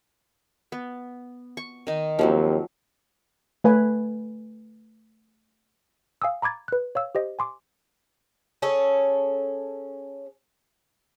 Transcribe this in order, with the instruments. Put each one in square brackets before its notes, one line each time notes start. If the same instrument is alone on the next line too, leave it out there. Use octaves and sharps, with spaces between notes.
[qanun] B3
C#6
D#3 D#4
[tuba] D#2 [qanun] F3 F#3 C4
[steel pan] A3 B4 G#5
[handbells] F5 G#5 D#6 E6
A#5 B5 D6 G#6 A6
B4 F#6
C#5 F5 E6
G4 C5 D#5
G#5 C6 D6
[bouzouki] C#4 G#4 A4 C#5